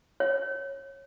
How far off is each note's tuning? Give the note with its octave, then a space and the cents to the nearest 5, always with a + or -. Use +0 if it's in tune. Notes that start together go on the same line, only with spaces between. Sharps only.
C#5 -20